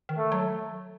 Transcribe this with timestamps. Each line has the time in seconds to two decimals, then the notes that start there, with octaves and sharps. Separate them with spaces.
0.09 D#3
0.17 A3
0.32 F#3